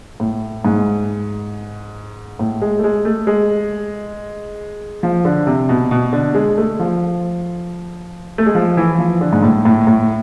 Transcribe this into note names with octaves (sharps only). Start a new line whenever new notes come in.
A2
G#2
A2
G#3
A3
G#3
A3
G#3
F3
D3
C3
B2
B2
D3
G#3
A3
F3
A3
G#3
F3
E3
F3
D3
G#2
A2
A2
A2